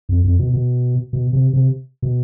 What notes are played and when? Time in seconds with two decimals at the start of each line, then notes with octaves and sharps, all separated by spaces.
0.09 F2
0.24 F2
0.39 B2
0.53 B2
1.13 B2
1.33 C3
1.53 C3
2.02 B2